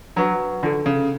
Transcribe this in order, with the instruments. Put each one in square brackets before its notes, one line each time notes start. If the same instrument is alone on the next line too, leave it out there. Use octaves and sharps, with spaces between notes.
[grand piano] F#3 [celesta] D4 F#4 B4 F#5 C#6
[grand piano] D3 [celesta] D4 F4 A4
[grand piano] C#3